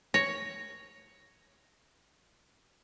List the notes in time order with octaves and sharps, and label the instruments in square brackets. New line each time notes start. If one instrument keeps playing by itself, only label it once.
[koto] C#5 [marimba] A#6